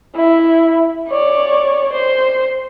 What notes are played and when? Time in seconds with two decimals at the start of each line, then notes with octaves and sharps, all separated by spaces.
0.15 E4
1.08 C#5 D5
1.93 C5